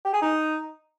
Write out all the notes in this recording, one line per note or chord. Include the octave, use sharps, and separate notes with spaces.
G4
G#4
D#4